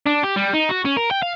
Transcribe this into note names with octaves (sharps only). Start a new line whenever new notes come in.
D4
G4
G3
D#4
F#4
C#4
A#4
G5
F5